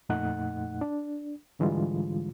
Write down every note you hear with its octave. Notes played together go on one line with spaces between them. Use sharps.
F2 A#2 A3 D#4 F#5 F#6
D4
G#2 D3 E3 G3 G#3 F4